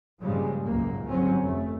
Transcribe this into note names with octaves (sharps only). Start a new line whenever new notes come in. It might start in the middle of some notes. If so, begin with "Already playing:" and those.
G2 A#2 C#3 F3 G3 G#3
G#1 C#2 F#2 A#2 A#3
G1 G#2 F#3 C4 C#4
F1 A3